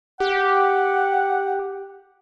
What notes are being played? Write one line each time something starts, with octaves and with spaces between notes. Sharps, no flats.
G4 F#5